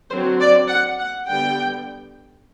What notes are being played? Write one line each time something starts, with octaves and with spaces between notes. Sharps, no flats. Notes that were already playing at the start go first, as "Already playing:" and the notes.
D3 F#3 C4 C5
D5
F#5
F#5
D3 G3 B3 G5